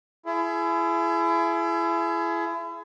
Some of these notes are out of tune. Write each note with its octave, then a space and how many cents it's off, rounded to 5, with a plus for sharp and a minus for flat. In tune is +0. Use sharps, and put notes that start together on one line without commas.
E4 +35 G#4 +30